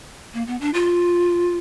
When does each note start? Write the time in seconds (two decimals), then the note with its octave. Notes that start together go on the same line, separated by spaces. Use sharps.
0.34 A#3
0.47 B3
0.61 D4
0.74 F4